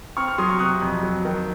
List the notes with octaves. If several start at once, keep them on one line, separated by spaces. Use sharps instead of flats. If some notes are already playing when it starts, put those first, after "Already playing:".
C4 C#6 F6
C#6 F6
F#3 C6 D#6
C#6 F6
C3 D#6 F#6
F2
F#3
D#3